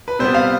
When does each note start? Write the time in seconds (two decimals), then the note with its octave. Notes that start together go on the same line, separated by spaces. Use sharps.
0.08 B4
0.19 C3 G3 B3 C5
0.34 F5